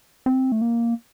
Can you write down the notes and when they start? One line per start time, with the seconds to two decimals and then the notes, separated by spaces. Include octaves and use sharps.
0.26 C4
0.52 A3
0.62 A#3